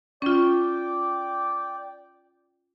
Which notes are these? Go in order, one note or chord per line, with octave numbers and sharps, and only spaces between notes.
C#4 F4 D5 G5 D6